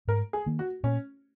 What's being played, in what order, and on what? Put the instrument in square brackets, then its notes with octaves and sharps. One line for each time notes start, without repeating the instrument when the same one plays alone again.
[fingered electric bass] G#2 [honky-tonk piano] A#4
[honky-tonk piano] G#4
[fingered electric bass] D#3 A#3
[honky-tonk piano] F#4
[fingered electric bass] A#2 [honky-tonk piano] C#4